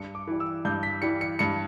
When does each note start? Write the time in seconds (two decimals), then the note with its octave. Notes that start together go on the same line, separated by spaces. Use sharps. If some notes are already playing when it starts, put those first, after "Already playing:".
Already playing: G2 C#7
0.15 D6
0.27 E3 G3
0.40 E6
0.65 G2 G6
0.83 B6
1.02 E3 G3 C#7
1.21 C#7
1.39 G2 C#7